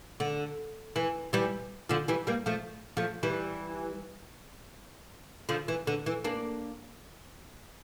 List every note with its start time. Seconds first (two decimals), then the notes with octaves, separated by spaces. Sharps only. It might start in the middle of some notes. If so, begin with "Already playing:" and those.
0.20 D3
0.96 E3
1.33 E3 G3
1.89 D3 F3
2.08 E3 G3
2.27 G3 A#3
2.46 F3 A3
2.97 F3 A3
3.23 E3 G3
5.49 D3 F3
5.68 E3
5.87 D3
6.06 E3
6.24 A#3 D4